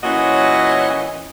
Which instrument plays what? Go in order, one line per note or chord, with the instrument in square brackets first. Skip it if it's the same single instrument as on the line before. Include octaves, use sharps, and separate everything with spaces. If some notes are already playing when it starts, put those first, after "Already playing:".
[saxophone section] A#2 E3 C#4 F#4 C#5 D#5